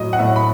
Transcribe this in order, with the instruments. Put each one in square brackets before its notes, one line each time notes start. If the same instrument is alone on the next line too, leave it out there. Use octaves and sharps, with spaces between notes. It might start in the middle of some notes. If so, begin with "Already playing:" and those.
Already playing: [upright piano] A2 F#3 D#5
F#5
A2 E5
B5